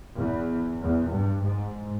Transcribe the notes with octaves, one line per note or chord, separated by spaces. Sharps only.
E2
E2
G2
G#2